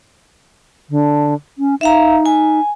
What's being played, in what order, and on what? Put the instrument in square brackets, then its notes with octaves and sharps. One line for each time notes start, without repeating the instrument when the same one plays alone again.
[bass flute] D3
C#4
[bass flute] D#4 [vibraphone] E5 F5 A#5
[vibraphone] G#5